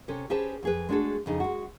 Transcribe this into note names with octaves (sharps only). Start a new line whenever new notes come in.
C3 C#4 G4 A4
C#4 G4 G#4 B4 C5 A5
F2 G#4 B4
G#3 A3 D4 F#4 G#4 A4
F2 C#3 D#4
G#3 F#4